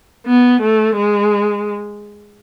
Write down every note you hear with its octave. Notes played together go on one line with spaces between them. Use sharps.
B3
A3
G#3